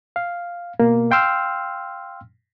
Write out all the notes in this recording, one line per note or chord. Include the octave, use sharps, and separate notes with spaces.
F5
B2 A#3
F5 G5 C6 E6 F6